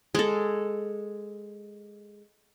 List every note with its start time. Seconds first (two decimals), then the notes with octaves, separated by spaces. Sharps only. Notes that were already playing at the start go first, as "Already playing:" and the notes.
0.15 G#3 A4